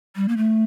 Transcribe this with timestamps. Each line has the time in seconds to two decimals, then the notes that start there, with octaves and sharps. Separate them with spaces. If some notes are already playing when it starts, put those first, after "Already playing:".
0.16 G3
0.28 A#3
0.37 A3